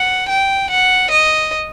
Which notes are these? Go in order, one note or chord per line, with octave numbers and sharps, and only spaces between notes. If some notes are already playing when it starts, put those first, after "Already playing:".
Already playing: F#5
G5
F#5
D#5